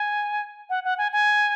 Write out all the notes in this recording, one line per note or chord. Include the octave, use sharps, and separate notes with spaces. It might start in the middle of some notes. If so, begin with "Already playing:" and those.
Already playing: G#5
F#5
F#5
G#5
G#5